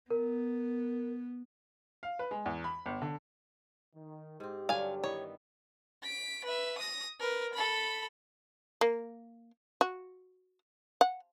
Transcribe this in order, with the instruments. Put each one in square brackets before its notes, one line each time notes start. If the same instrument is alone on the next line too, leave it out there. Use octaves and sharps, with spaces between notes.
[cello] B3 [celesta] A#4
[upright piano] F5
B4
G#3
E2
B5
G1
D3
[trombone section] D#3
[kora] G#2 C4 [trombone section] G4
[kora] G2 D3 F#3 [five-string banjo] F5 G#5
[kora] D#3 E3 B3 [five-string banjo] C#5
[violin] B6 D7
B4 E5
D#6 A#6
A#4 B4
A4 B5
[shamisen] A#3
F#4
F#5